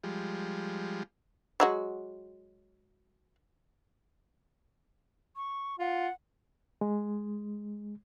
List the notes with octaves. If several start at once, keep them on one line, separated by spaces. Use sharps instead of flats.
F3 G3 G#3
F#3 G#3 F#4
C#6
F4 F#5
G#3